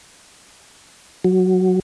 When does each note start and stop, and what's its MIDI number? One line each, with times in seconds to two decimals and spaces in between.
1.25 1.79 54